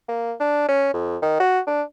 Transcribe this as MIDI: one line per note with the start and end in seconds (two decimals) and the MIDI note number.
0.09 0.34 58
0.40 0.67 62
0.68 0.90 61
0.93 1.17 41
1.22 1.37 51
1.40 1.60 66
1.67 1.82 62